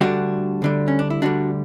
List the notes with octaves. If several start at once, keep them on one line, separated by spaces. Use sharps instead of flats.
D2 D3 G3 D4 F#4
D2 D3 G3
C#4
D4
E4
D2 D3 G3 D4 F#4